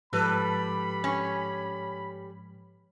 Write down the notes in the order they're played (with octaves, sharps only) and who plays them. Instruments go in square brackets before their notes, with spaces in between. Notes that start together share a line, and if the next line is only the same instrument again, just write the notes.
[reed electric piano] G#2 F3 G#3 [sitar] G3 A4 B4 [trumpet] B5
[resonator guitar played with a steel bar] C#4